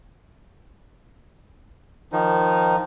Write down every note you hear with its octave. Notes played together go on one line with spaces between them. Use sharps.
D#3 F3 D#4